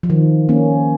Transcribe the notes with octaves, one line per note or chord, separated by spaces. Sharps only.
F3
D#3
A#3 C#4